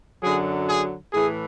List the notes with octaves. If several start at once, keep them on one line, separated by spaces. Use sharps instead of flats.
F#2 D3 F#3 G#4
G#4
A2 E3 G#4